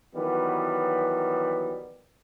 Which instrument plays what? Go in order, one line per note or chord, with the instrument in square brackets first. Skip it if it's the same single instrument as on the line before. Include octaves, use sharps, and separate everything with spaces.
[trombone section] D#3 E3 F#3 G3 B3